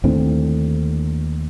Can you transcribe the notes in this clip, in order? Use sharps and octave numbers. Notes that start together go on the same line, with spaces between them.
D#2 A2 D3 C4